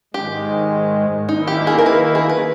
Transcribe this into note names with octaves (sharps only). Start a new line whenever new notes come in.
G#2 D#3 G#3 G4
D#3 A#3 D#4 E4
G4
G#4
A#4
B4
G#4
B4